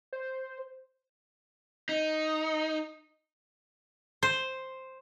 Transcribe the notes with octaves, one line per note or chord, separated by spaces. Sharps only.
C5
D#4
C5